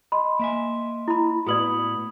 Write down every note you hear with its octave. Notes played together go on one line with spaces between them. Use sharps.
D#5 B5 C6
A#3 E5 G#5
E4 B5
A2 B3 F#4 B4 D5 B5 D#6 F#7